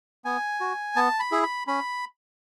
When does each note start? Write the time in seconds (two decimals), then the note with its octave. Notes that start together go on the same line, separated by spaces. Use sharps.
0.25 B3 G#5
0.60 F#4
0.96 B3 A5
1.20 B5
1.32 E4 G#4
1.43 B5
1.67 C#4 B5